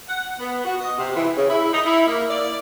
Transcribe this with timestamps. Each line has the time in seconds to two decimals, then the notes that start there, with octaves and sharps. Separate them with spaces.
0.08 F#5
0.39 B3
0.64 F#4
0.81 D#5
0.97 C3
1.14 E3
1.36 C#3
1.49 E4
1.72 D#4
1.86 E4
2.06 A#3
2.29 D5